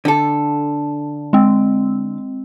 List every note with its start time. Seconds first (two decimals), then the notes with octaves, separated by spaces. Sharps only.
0.05 D3 A4
1.33 G#3 C4